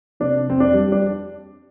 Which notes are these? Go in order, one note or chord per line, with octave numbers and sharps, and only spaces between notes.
C3 D4
F2 C4
D4
G3
D4